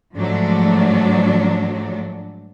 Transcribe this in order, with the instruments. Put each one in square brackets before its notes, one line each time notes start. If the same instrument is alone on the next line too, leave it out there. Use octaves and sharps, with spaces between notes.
[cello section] G#2 F3 F#3 A3 D4